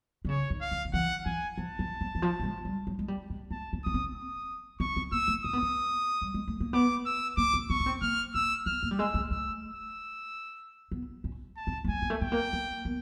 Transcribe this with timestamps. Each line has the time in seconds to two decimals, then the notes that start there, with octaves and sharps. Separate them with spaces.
0.25 D3
0.29 C#3 C#5
0.50 D#3
0.61 F5
0.71 E3
0.85 D#3
0.93 E3 F#5
1.26 E3 G#5
1.58 F3 A5
1.79 F3
2.01 F#3
2.15 E3
2.22 F3
2.40 G3
2.43 G#3
2.65 G3
2.87 F#3
2.99 G#3
3.08 G3
3.30 G#3
3.51 A3 A5
3.73 C#4
3.83 C#4 D#6
3.94 C4
4.15 D#6
4.80 C4 C#6
4.97 C4
5.12 A#3 E6
5.28 A3
5.44 C4 D#6
5.53 B3
5.62 C4
6.22 G3
6.34 G#3
6.48 A3
6.60 A#3
6.73 B3 D6
7.05 E6
7.37 A#3 D6
7.54 C4
7.70 C4 C#6
7.80 C#4
7.86 C4
8.02 A#3 F6
8.34 C4 E6
8.66 B3 F6
8.83 A#3
8.91 G3
8.99 G#3 E6
9.14 A3
9.30 A3 E6
9.63 E6
10.92 B3
11.24 C#4
11.57 A5
11.67 C4
11.84 A#3
11.88 A3 G#5
12.02 G#3
12.10 A3
12.21 A3 G5
12.32 A#3
12.53 A#3
12.85 B3